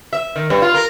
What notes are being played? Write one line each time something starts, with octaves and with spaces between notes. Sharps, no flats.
E5
D#3
G2
F4
A#4